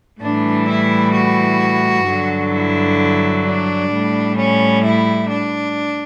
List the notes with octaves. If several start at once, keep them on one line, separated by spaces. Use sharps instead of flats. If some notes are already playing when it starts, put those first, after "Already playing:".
A2 E3 G3 D4
E4
F#4
G2 D3 F#3
E4
D4
A2 G3
C#4
E4
D4